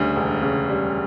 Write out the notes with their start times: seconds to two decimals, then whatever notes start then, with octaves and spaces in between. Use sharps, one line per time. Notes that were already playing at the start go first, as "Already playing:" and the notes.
Already playing: D2 C#3 G3
0.16 E1
0.42 C#3
0.70 G3